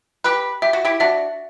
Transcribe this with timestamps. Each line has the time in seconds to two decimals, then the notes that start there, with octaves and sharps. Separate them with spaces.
0.24 G4 B4 F#6
0.62 G4 E5
0.73 F#4
0.85 E4 G4
1.00 D4 F#4 E5